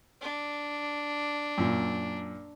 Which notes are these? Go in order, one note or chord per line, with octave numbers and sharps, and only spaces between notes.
D4
F#2 A#2